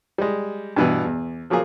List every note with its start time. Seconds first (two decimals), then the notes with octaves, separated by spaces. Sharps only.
0.18 G3 G#3
0.76 G2 B2 E3
1.05 E2
1.50 F3 F#3 A#3 F4 G#4